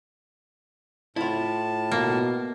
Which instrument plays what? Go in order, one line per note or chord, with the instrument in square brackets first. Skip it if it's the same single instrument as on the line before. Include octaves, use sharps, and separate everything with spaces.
[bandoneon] A2 A5 [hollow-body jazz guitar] E4 F4
[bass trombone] B2 [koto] A#3